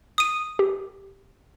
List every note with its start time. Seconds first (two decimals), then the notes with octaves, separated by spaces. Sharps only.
0.18 D#6 D#7
0.59 G4